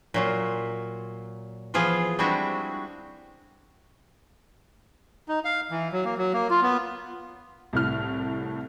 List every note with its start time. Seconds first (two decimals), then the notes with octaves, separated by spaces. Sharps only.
0.14 A#2 F#3 F4
1.74 E3 F3 B3 F4 G#4
2.19 G3 G#3 C4 D4 E4 F#4
5.28 D#4
5.45 F5
5.71 E3
5.92 F#3
6.05 A#3
6.18 F#3
6.33 A#3
6.50 F4
6.62 B3
7.73 C2 A2 F6